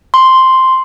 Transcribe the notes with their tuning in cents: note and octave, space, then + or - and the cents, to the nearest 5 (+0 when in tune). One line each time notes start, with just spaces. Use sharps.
C6 +0